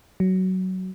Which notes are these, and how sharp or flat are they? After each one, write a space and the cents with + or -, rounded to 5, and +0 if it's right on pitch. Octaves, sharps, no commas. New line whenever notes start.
F#3 +15